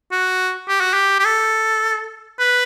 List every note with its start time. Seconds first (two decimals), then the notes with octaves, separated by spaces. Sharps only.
0.12 F#4
0.68 G4
0.81 F#4
0.94 G4
1.19 G4
1.25 A4
2.39 B4